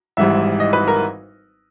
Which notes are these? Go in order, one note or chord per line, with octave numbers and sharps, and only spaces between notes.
G#1 G#2 E3 G3 E5
D#5
B4
A#4